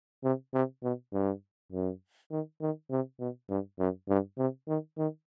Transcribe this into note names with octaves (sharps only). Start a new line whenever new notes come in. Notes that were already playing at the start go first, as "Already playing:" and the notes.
C3
C3
B2
G2
F#2
D#3
D#3
C3
B2
G2
F#2
G2
C3
D#3
D#3